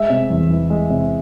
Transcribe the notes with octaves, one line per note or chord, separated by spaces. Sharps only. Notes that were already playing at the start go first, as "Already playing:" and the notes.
Already playing: G#3 E5
C3
E2
E3
G#3
C3